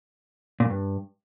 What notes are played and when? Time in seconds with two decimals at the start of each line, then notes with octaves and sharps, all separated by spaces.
0.60 A#2
0.65 F#2
0.70 G2